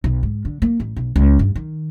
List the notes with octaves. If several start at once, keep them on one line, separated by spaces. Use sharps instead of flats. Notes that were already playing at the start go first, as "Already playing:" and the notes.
B1
G#2
D3
A#3
A1
B1
C#2
G2
D#3